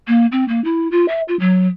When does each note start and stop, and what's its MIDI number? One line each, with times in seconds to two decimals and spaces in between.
0.07 0.26 58
0.32 0.46 60
0.48 0.62 58
0.64 0.90 64
0.91 1.06 65
1.08 1.21 76
1.28 1.38 65
1.39 1.68 54